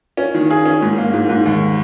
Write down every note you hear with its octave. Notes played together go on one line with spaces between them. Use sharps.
C#4
D#3
G#4
C#4
G#2
A#3
G#2
G#2
D#2